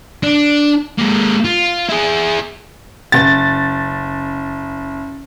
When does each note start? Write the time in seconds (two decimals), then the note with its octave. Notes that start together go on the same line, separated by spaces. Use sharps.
0.23 D4
0.98 G#3 A#3
1.44 F4
1.89 E4 G#4
3.12 F#1 A6